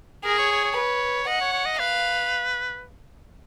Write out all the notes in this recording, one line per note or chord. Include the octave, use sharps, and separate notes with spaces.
G#4 A#4
C#5
C#5
C#5
B4
D#5 F#5
C#5
C#5
D#5
B4 F5